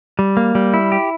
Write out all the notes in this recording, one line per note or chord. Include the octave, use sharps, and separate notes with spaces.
G3
A#3
G3
E4
G4